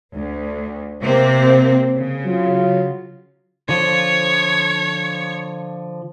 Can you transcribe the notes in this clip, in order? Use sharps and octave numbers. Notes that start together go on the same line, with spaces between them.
D2
C3 A#3 C4
C#3
F#3 F4
D3 F3 C#5